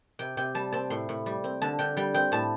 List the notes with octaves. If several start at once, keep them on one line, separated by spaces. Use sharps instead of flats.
C3 G5
C3 G5
G3 A5
C4 A5
A2 C6
A2
G3
C4
D3 A5
D3 G5
G3 G5
C4 G5
A2 A5